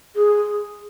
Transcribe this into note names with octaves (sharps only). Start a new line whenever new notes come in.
G#4